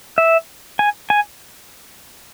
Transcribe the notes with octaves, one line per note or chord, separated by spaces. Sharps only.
E5
G#5
G#5